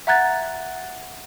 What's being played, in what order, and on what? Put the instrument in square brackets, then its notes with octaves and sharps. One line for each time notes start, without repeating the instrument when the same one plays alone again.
[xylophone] E5 F#5 A#5 F#6 G#6 A6